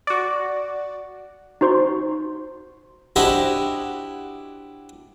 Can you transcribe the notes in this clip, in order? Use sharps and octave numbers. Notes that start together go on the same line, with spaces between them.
F#4 D5
D#4 F#4 C5 C6 C#6
D4 E4 F#4 G4 C5 D#5